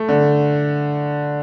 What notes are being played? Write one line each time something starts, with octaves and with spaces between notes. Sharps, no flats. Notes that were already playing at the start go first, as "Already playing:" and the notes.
Already playing: A3
D3